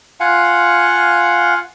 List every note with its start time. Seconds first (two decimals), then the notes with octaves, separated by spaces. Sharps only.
0.20 F4 F5 F#5 G#5